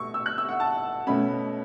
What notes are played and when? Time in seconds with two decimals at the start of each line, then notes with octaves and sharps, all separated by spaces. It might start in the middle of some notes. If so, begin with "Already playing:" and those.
Already playing: B2 A3 C#6 E6
0.14 E6
0.26 F#6
0.38 E6
0.49 F#5
0.60 A5
1.07 B2 A3 C#4 B5